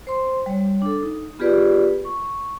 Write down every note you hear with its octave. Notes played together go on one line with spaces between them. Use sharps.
C5 C6
G3 C#5
D4 A4
D#4
B3 F4 G4 G#4 B4 D5
C#6